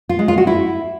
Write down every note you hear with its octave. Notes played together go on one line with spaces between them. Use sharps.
F4
G#3
F4
F#4
E4